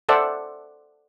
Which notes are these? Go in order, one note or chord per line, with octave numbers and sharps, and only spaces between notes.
A4 C5 D5 E5 F#5 A5